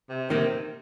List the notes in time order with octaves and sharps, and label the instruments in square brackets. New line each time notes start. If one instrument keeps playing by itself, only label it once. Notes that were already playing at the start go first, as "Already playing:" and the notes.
[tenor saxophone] C3
[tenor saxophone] C3 [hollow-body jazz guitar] D#3 A#3